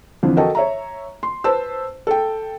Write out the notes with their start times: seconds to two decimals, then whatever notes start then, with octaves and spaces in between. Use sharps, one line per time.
0.23 F2 D3 E3 F3
0.37 F#4 A4 A#4 D#5 G5 A5
0.55 C#5 E5 A#5
1.23 C6
1.44 B4 C5 A5 E6
2.07 A4 G5